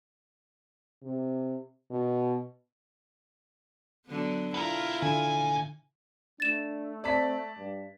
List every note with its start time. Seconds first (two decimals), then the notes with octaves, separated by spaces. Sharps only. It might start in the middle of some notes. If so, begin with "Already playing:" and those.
1.03 C3
1.91 B2
4.06 D3 F#3 B3
4.54 B3 E4 F4 A#4
5.03 A#2 D3 G#5
6.40 A3 D4 A6 E7
7.04 C4 D5 A5 B6
7.58 G2